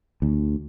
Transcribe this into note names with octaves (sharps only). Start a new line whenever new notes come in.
D2